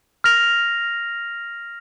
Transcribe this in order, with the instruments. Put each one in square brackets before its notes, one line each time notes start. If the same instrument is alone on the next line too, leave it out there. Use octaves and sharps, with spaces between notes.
[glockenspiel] F6 A#6 F7